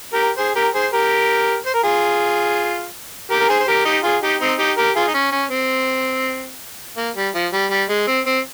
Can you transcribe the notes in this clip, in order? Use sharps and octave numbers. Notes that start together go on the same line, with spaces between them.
G4 A#4
G#4 C5
G4 A#4
G#4 C5
G4 A#4
C5
A#4
F4 G#4
G4 A#4
A#4
G#4 C5
C5
G4 A#4
D#4 G4
F4 G#4
D#4 G4
C4 D#4
D#4 G4
G4 A#4
F4 G#4
D#4
C#4
C#4
C4
A#3
G3
F3
G3
G3
G#3
C4
C4